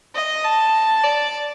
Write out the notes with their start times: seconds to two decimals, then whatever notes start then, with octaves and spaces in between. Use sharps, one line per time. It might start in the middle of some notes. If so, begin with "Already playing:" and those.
0.15 D#5
0.45 A5
1.05 D5